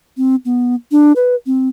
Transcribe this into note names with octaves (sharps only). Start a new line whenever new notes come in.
C4
B3
D4
B4
C4